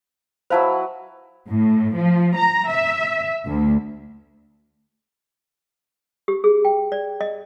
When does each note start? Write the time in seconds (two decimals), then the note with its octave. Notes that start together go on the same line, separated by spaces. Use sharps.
0.50 F#3 E4 B4 C5 F5 A5
1.48 A2
1.95 F3
2.36 A#5
2.69 E5
3.46 D2
6.28 G4
6.44 G#4
6.65 G5
6.92 D5
7.21 D#5